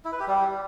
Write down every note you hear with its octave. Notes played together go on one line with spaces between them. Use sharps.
E4
B4
G4
G3